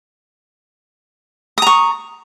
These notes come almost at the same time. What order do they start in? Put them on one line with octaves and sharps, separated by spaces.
D#6 A#5 C#6